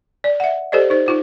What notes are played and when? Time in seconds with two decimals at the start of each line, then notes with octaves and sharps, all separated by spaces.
0.24 D5
0.40 E5 F#5
0.72 G4 A4 C5 D5 D#5
0.90 D#4 C5
1.06 D#4 F4 C5